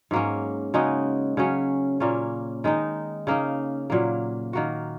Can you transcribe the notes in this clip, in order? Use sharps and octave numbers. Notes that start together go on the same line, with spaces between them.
G#2 F#3 A#3 C#4
C#3 G#3 D#4 F#4
C#3 F#3 C#4
A#2 A#3 C#4
D#3 G#3 D#4
C#3 A#3 D#4
A#2 F#3 A#3
D#3 A#3 F#4